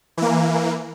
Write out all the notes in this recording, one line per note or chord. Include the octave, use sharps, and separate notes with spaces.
E3 A#3